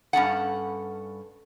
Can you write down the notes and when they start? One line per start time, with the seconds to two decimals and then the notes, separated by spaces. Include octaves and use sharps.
0.13 G2 C#4 A4 F#5